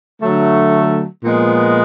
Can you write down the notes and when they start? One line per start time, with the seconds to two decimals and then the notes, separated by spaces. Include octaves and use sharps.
0.21 D3 F#3 A3
1.23 A#2 F3 G#3 B3